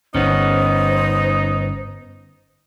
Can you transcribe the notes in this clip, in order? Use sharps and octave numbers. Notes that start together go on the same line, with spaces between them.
G1 B3 C#4 D#4 C5